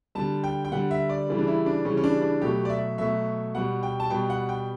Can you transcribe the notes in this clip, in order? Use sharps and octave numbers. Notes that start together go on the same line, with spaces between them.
D3 G3 A5
G5
G5
D3 G3 F#5
E5
D5
C#3 E3 G3
D4
E4
D4
C#3 E3 G3 C#4
C#4
D4
D4
B2 F#3 A3 G4
D5
E5
B2 F#3 A3 E5
B2 G3 F#5
G5
A5
B2 G3 G5
F#5
G5